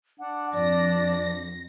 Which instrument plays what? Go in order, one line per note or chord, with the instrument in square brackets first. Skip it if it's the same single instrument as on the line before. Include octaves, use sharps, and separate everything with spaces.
[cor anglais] D4 [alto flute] F#5
[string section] F2 A#6 [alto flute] D5